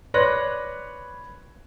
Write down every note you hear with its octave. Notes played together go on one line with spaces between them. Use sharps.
B4 C#5 D5 C6 F#6 A#6